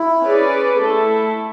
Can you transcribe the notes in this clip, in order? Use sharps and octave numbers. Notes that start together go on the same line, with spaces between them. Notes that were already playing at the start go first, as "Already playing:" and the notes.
Already playing: E4
C#4 G#4 B4 D5
A3 E4 A4